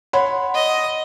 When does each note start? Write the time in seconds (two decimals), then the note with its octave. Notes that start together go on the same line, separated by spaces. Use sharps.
0.13 C#5 F#5 B5 C6
0.54 D#5